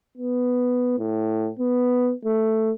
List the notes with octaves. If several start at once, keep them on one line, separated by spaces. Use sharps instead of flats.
B3
A2
B3
A3